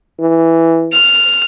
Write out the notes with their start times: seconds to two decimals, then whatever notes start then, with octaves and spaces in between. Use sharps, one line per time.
0.20 E3
0.93 F6